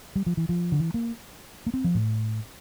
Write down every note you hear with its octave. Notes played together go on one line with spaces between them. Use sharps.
G3
F3
E3
F3
D3
E3
A#3
A#3
C4
F3
A2